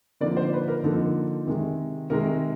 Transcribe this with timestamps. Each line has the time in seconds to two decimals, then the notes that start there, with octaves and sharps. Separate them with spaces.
0.20 D3 F3 A#3 D#4 D5
0.37 C5
0.53 B4
0.68 A#4
0.84 D3 F3 A#3 D#4 A4
1.46 C3 D#3 G#3
2.10 C3 D#3 G#3 A#4